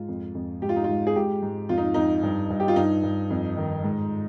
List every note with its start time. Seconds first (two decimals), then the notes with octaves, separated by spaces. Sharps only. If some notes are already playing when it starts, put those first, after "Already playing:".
Already playing: G#2 F4
0.09 F2
0.35 F2
0.62 G#2 G4
0.69 F4
0.76 D#4
0.84 G#2 F4
1.07 G#4
1.16 G#2 G4
1.42 G#2
1.69 F2 F4
1.78 D#4
1.94 F2 D#4
2.23 G2
2.50 G2
2.60 G4
2.68 F4
2.76 G2 D#4
3.03 G2
3.30 F2
3.57 D#3
3.84 G#2